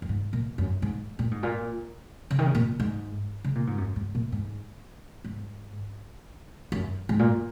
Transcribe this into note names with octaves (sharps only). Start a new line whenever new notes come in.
F#2
G#2
A#2
F#2
G#2
A#2
G#2
A#2
C#3
D#3
C#3
A#2
G#2
C#3
A#2
G#2
F#2
G#2
A#2
G#2
G#2
F#2
G#2
A#2